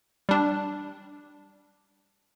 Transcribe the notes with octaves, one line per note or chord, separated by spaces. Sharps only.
G3 D4